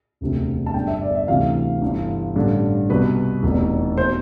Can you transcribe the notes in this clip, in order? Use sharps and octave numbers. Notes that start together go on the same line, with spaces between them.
E1 D2 C3
A5
G1 G2 D3 G5
E5
D5
E5
D2 C3 E3 F5
G1 G2 E3
A1 G2 D3
C2 B2 B4
F1 E2 B2
B2 C5